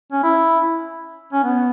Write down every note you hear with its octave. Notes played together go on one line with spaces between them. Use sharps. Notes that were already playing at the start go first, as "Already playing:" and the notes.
C#4
E4
C#4
B3